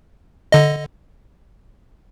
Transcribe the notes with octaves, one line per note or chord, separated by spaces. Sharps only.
D3 D#5